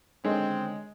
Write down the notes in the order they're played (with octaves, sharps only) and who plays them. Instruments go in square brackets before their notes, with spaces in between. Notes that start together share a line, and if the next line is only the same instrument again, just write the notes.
[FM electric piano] D3 D#3 C#4 [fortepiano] G#3 [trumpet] C4